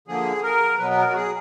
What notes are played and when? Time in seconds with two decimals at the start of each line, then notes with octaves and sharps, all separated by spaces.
0.08 D3 F3 A#3 G#4
0.43 A#4
0.78 B2 F#3 B3 B4
0.90 B4
0.97 A#4
1.10 F#4
1.15 G#4